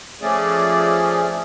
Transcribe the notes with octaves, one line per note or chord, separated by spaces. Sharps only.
F3 A3 C#4 G#4 D5